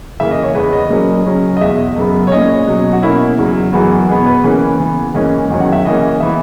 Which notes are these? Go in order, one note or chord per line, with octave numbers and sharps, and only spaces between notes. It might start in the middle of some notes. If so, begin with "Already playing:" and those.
C#3 E3 A#3 E5
D#5
C#5
E2 C#3 G#3 B3 B4
D#5
A#2 F#3 A#3 C#4
C#3 F#3 C#4
D#5
E2 B2 G#3 E5
F#2 C#3 G#3 B3
C#5
A#2 G#3 C#4 D#5
B2 F#3 C#4
F#4
B2 A#3 C#4 E4
E2 C#3 F#3
F#2 E3 G#3 B3 F#4
B2 G#3 B3 G#4
B4
C#3 E3 A#3 C#4
C#3 E3 B3
G#2 E3 A#3 C#4 D#5
E2 D#3 F#3 C#4
F#5
E5
C#3 E3 A#3 C#4 D#5
E3 B3 E5